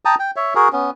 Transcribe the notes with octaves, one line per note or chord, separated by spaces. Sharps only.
G5 A5 A#5 D#6
G5
C#5 E5
F#4 G#4 A#4
B3 C#4